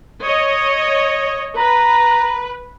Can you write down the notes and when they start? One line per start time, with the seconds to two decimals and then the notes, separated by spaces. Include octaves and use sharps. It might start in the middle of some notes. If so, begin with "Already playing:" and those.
0.25 C#5 D#5
1.57 B4 A#5